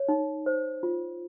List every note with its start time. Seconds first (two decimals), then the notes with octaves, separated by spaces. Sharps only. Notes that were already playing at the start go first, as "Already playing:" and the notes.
Already playing: C#5
0.08 D#4
0.46 C5
0.83 F4